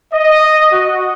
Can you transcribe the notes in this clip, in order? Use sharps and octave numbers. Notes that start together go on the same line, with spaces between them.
D#5
F#4